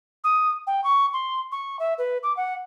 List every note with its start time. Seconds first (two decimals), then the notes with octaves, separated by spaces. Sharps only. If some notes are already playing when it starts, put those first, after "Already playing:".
0.24 D#6
0.66 G5
0.83 C#6
1.13 C6
1.51 C#6
1.79 E5
1.98 B4
2.23 D6
2.36 F#5